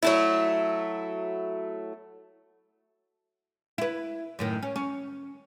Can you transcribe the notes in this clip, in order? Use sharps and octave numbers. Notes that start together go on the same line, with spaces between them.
F#3 A3 E4
E4 B4
F#2 A2 D#3
C#4
C#4